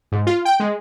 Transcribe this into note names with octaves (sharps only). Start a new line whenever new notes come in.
G#2
F4
G5
G#3